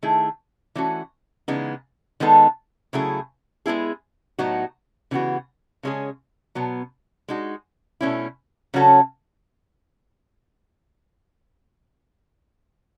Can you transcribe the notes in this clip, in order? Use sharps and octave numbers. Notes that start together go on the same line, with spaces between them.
D#3 A3 E4 G#4
E3 A3 C#4 F#4
C#3 E3 G#3 B3 D#4
D#3 G#3 B3 D#4 A4
C#3 F#3 A3 E4 G#4
G#3 B3 E4 G#4
A2 F#3 B3 D#4 F#4
C#3 E3 B3 F#4
C#3 G#3 C#4 G#4
B2 F#3 B3
G#3 D#4 F#4
B2 A3 C#4 E4
C#3 F#3 C#4 F#4 A4